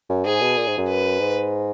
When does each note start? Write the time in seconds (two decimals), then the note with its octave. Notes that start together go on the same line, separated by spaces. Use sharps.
0.09 F#2
0.25 G#2 G#4
0.41 B2
0.57 A#2
0.67 G#2
0.78 F#2
0.88 B4
1.20 G#2